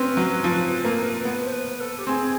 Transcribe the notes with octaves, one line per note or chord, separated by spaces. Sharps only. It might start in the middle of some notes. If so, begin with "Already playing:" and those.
Already playing: C4 C#4 B4
F#3
F3
A#3
B3
C5
B4
A4
G4
C4 G#4